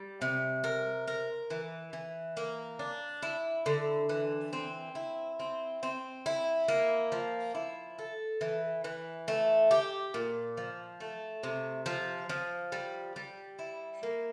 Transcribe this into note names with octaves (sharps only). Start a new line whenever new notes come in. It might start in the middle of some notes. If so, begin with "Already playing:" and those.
Already playing: G3
C3
A#4
A#4
E3
E3
A#3
D4
E4
D3
E3
C4
E4
C4
C4
E4
A#3
F3
E4
A4
E3
E3
A3
G4
A#2
F3
A3
C3
F3
F3
G3
G3
E4
A#3